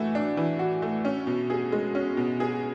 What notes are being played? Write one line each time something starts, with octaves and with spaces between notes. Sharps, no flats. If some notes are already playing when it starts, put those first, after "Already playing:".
Already playing: E3 A3 F#4
D4
E3
F#4
A3
C#4
B2
G#4
G#3
C#4
B2
G#4